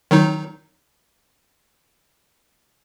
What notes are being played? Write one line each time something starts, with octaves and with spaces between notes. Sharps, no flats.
D#3 F#3 D#4